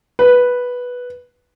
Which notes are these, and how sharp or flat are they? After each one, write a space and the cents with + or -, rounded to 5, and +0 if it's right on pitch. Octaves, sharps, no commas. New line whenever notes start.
B4 -5